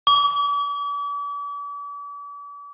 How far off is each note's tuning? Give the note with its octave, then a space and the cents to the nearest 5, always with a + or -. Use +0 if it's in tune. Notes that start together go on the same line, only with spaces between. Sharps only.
D6 -40